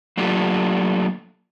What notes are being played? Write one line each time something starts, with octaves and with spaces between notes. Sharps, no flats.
F#3 A3 A#3 D4 F4 G4